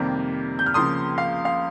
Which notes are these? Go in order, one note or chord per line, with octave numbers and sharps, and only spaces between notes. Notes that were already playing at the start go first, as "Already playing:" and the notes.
Already playing: F2 C3 D#3 G3 A#3
G6
F6
C#2 C#3 F3 A#3 C6 D#6
F5
F5